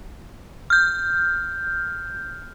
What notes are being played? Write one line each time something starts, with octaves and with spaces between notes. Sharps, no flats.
F6 G6